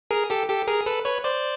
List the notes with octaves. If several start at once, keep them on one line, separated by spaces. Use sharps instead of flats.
G#4 A#4
G4 A4
G4 A4
G#4 A#4
A4 B4
B4 C#5
C5 D5